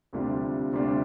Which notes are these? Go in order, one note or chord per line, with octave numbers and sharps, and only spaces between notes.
D2 C3 G3 D4 F4
D2 C3 G3 D4 F4